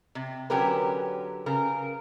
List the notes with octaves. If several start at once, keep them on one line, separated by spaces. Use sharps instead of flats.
C3
D3 F#3 C#4 G4 A#4 B4
C#3 A#4